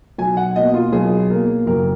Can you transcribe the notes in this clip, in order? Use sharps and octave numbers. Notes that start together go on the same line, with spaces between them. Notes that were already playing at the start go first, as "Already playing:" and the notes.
B1 G#5
F#5
B2 A#3 D#5
F4
B1 G#4
B2 A#3 A#4
F#1 A#4